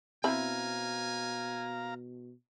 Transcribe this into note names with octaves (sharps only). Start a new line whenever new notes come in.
B2 C4 E4 F5 G#5 A#5 B5